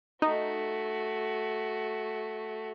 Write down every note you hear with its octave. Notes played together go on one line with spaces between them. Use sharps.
A3 D#4 F#4